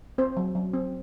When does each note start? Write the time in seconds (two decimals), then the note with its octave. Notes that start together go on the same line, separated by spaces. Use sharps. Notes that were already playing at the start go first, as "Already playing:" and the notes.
0.18 C4 C5
0.37 F#3
0.55 F#3
0.74 C4